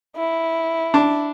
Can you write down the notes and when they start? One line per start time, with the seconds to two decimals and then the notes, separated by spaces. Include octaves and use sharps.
0.16 E4
0.94 D4